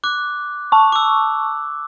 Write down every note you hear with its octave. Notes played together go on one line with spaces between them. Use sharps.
D6 F#6
A5 C#6
D6 E6